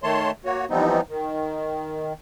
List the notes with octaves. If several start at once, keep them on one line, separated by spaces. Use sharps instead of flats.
D#3 A3 C#5 A5 C6
A#3 F#4 C#5
E3 F3 G3 B3 C4 D#4
D#3